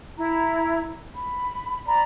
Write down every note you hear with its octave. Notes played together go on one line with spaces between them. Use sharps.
E4 A#5
B5
D5 A#5 B5